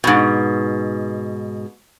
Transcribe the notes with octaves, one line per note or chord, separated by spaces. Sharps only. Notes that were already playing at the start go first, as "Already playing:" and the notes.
G#2 B2